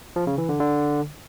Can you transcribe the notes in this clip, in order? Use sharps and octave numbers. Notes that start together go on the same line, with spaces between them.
F3
C#3
E3
D3
D3